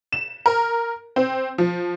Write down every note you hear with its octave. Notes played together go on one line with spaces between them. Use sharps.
E7
A#4
C4
F3